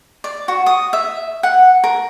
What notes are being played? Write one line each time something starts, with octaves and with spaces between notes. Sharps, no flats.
D5
F#4
D#6
E5
F#5
A#4